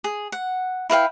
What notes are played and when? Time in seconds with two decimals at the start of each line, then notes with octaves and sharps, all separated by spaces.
0.04 G#4
0.32 F#5
0.90 E4 B4 F5 G5